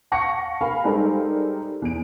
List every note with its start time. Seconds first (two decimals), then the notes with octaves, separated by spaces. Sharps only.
0.12 F5 F#5 A5 C#6 A#6 C#7
0.61 A#4 F5 G#5 B5
0.84 G3 G#3 D#4 A4 A#4 C5
1.82 E2 D7